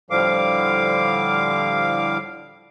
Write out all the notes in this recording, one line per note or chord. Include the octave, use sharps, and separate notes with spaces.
A2 D3 F3 G3 F5 D6